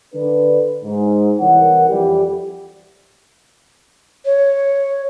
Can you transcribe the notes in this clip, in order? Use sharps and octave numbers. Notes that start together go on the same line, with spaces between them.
D3 D4 B4
G#2
C2 E3 A#4 C#5 F#5
F2 E3 G3 G4
C#5